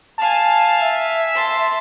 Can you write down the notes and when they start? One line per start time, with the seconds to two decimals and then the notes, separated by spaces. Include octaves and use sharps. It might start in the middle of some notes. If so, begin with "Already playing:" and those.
0.19 F5 G#5 A5
0.80 E5
1.35 A5 C6